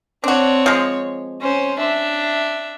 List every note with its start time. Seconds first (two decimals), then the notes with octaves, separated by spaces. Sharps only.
0.24 C4 D4 F#4 C#5
0.66 F3 G#3
1.41 C#4 C5
1.79 D4 E5